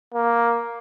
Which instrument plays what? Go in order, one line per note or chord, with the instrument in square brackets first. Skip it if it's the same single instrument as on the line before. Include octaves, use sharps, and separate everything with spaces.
[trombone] A#3